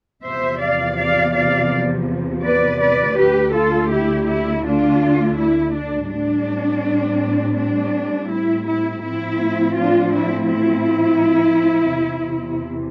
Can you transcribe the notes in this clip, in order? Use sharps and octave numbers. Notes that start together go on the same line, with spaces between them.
E2 C3 F3 B3 C5 E5
D5 F5
D5 F5
D5 F5
B4 D5
B4 D5
D2 D3 A3 G4 B4
F4 A4
E4 G4
E4
D4 F4
E4
D4
A2 G3 C4 D4
D4
E4
E4
A2 F3 A3 C4 E4
D4 F4
E4
E4
E2 C3 E3